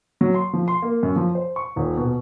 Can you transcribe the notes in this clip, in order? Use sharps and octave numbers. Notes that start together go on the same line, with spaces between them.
F#3
C6
F3
C6
A#3
F#2
F3
C5
C#6
D#1
B2